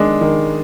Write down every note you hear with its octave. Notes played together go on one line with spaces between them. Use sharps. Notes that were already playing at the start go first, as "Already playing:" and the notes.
Already playing: D#3 G#3 D4
D#3